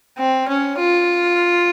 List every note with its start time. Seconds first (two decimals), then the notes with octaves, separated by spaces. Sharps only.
0.18 C4
0.48 C#4
0.79 F4